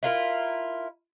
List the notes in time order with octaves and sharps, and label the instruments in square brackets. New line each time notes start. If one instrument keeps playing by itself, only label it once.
[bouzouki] E4 F4 A#4